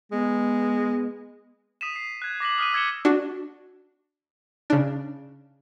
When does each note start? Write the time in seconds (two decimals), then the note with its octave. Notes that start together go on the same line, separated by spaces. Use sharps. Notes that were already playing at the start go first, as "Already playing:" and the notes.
0.12 G#3 B3
1.81 D#6 B6 D#7 E7
1.96 C7
2.22 F#6 G#6
2.40 D6 A#6 B6 F#7
2.58 D#6 F6 B6 D#7
2.74 E6 G#6 A#6 C#7 E7 G7
3.05 D4 F#4
4.70 C#3 D4